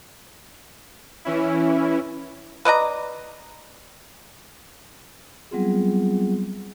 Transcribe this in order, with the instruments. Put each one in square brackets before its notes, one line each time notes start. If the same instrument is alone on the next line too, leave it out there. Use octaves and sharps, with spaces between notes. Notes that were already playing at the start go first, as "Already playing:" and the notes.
[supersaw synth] E3 C#4 E4
[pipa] B4 D5 D#5 A#5
[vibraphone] F#3 G3 B3 C4 F4 G#4